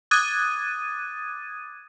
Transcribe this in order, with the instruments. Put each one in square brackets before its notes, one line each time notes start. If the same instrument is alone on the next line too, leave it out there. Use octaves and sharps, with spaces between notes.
[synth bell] D6 D#6 F#6 G#6 A6 D#7